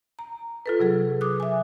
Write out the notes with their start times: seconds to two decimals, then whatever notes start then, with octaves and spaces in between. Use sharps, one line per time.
0.19 A#5
0.66 F4 A4 B4
0.80 C3 F#3 G#4 A4
1.21 D6 D#6 F#6
1.40 E5 G#5